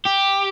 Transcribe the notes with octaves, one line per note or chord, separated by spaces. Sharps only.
G4